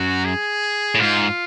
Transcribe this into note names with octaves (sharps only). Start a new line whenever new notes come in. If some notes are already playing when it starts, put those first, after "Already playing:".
Already playing: F#2 F#4
G#4
A2
G#2 F4